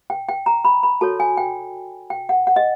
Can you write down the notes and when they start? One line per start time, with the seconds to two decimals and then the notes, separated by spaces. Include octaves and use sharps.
0.10 G5
0.29 G5
0.46 A#5
0.65 B5
0.83 B5
1.01 F#4 A4 C#5 A5
1.20 G#5
1.37 G5
2.10 G5
2.29 F#5
2.47 F#5
2.56 D#5